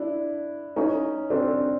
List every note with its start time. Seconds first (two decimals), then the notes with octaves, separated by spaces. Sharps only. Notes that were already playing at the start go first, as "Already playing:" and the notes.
Already playing: D4 E4
0.76 C#4 D#4
1.30 C4 D4